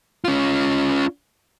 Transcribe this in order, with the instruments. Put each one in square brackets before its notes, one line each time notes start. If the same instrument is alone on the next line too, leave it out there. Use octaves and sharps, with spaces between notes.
[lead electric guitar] C#4 F4